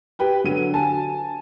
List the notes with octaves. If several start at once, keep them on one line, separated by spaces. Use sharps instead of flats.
G4 B4 G5
D3 F#3 D#7
G#5 A5